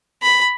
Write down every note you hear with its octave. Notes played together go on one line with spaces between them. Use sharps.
B5